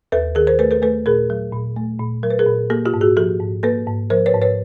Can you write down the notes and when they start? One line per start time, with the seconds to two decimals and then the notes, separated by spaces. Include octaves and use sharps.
0.12 D#2 A4 B4
0.35 D#3 G#4 A#4
0.47 A#4 C5
0.59 A3 A4 B4
0.71 A4 B4
0.82 A3 A4 B4
1.06 A#2 G#4 A#4
1.30 F#3
1.53 A#2
1.76 A3
1.99 A#2
2.23 F#3 A#4
2.30 B4
2.39 G#4 A#4
2.46 A#2
2.70 A#3 G4 A4
2.85 F4 G4
2.94 G#2
3.01 F#4 G#4
3.17 F3 G4 A4
3.40 G#2
3.63 A#3 A4 B4
3.87 G#2
4.10 F3 A#4 C5
4.26 B4 C#5
4.34 G#2
4.42 B4 C#5